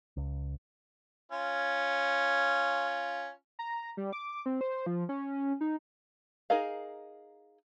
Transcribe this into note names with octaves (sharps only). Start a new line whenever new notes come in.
C#2
C#4 F4
A#5
G3
D6
C4
C5
F3
C#4
D#4
D#4 G#4 A#4 D#5 F5